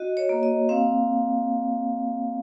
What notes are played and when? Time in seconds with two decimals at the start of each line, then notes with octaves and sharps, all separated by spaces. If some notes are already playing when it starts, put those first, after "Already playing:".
Already playing: F#4 D#5
0.17 C#5
0.29 A#3
0.43 D#5
0.69 C4 F5